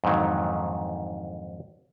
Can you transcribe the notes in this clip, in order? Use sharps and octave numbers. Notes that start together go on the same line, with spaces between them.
F2 G#2 D3 D#3 F#3